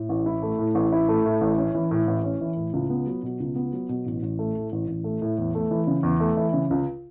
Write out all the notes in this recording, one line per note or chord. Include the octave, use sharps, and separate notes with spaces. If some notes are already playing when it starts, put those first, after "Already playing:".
Already playing: A2
A1
E4
A3
A2
A1
E4
A3
A2
A1
C#4
E3
A2
A1
C#4
E3
A2
C#2
B3
F#3
B2
C#2
B3
F#3
B2
A1
A1
A3
A2
A1
A1
A3
A2
E2
A3
E3
C#3
E2
A3
E3
C#3
C#2